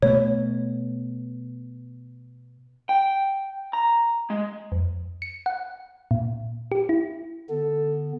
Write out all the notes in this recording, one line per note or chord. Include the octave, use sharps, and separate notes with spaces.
B2 A3 B3 C#5
G5
A#5
G#3
F2
C#7
F#5
A#2
G4
E4
D3 B3 A4